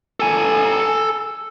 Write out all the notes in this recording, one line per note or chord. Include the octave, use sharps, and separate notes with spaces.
A4 G#5